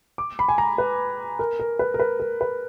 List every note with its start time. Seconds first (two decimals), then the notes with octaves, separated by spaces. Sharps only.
0.18 D6
0.39 B5
0.49 G#5
0.58 A#5
0.78 B4
1.39 A#4
1.59 A#4
1.79 B4
1.94 A#4
2.00 B4
2.20 A#4
2.41 B4